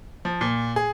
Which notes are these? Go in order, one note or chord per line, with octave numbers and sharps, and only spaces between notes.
F3
A#2
G#4